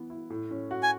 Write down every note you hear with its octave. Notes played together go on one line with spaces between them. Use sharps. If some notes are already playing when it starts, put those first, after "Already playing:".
Already playing: E3 B3
E4
A2
C#4
F#4
G#5